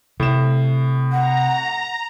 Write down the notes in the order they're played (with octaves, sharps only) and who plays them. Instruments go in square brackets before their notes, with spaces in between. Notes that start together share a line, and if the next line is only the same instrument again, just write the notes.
[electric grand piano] A2 E7 [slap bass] C3
[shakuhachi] F#5 [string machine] A#5